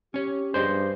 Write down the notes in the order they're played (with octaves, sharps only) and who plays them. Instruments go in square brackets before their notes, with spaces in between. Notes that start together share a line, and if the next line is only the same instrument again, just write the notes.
[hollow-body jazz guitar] C#4 C#5 [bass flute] G4
[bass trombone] G2 [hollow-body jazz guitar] G#4 D5 D#5 [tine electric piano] C5